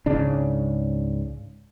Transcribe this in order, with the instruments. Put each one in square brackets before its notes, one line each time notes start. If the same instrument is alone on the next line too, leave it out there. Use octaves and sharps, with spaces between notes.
[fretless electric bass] C#2 G#2 C#3 D4